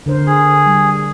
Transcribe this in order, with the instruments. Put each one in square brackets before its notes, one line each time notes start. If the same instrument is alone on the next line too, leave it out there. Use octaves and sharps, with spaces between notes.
[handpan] D3 A#4 C5
[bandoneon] G#4
[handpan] G3